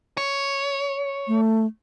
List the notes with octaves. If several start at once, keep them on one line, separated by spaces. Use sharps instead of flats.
C#5
A3